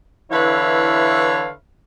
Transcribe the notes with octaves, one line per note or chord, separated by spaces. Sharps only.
D3 E3 E4 B4 C#5 F5